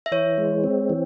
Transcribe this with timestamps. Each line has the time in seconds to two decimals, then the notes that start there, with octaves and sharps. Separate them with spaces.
0.06 E5
0.11 E3 C#5
0.38 G#3
0.64 C4
0.90 E3